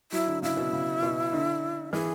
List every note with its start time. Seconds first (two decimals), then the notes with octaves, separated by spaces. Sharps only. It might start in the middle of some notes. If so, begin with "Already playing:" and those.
0.12 F#3 E4
0.27 D3
0.42 C#3 E4
0.57 B2
0.73 C#3
1.03 B2
1.33 D3
1.93 E3 G#4